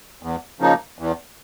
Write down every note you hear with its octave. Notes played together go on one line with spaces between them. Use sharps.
E2
C#3 F3 A#3 D#4
E2